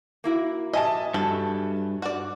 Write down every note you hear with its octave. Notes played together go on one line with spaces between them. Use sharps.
A#3 E4 F#4
D#5 E5 G#5 A5
G2 F#3 A4
F#4 D5